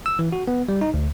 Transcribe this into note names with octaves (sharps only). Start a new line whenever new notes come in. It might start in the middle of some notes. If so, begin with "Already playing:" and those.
E6
E3
F#4
B3
G3
D#4
D2